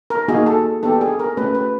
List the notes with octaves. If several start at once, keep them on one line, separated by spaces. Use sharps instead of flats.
A#4
A#3 D#4 F#4 G#4
A4
B3 D4 G4 A4
G#4
A#4
A3 C#4 F#4 B4
B4